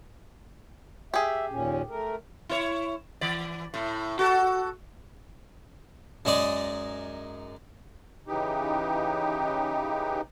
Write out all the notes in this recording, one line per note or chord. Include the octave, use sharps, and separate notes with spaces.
G4 G#4 E5
D#2 A#2 C#4
A3 A#4
E4 C#5
E3 D5
A2 E4
F#4 A4
F#2 G#3 D#4 D5 G#5
C#3 E3 D#4 G4